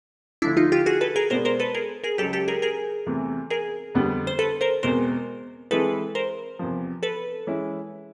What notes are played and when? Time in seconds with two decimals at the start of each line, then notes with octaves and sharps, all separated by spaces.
0.42 D2 D3 F3 A3 D4 E4
0.57 D#4 F4
0.72 F4 G4
0.86 F#4 G#4
1.01 A4 B4
1.16 G#4 A#4
1.30 B2 G#3 B3 D4 A#4 C5
1.45 A#4 C5
1.60 A4 B4
1.75 G#4 A#4
2.04 G#4 A#4
2.18 C#2 C#3 F#3 G4 A4
2.33 G4 A4
2.48 G#4 A#4
2.62 G#4 A#4
3.06 E2 C3 E3 A3
3.50 G#4 A#4
3.95 F2 D3 G3 B3
4.27 C5
4.39 A4 B4
4.61 A#4 C5
4.83 E2 B2 G#3 C4 A#4 C5
5.71 E3 G#3 C4 E4 G#4 A4 B4
6.15 A#4 C5
6.59 E2 C3 F3
7.03 A4 B4
7.47 E3 G#3 C#4 E4